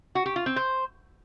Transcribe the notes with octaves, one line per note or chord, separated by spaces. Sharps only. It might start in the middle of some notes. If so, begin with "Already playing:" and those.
F#4
G4
F4
C4
C5